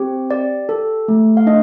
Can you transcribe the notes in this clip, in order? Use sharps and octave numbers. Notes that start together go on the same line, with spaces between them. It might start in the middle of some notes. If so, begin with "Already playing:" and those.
Already playing: C4 G4
G4 D5
A4
A3
F5
D4 D#5